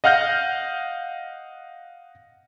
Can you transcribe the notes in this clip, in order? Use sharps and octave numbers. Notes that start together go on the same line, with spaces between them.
D#5 F5 F#5 F6 G6 A#6